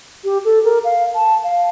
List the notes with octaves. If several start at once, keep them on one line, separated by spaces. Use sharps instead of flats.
G4
A4
A#4
F5
A5
F5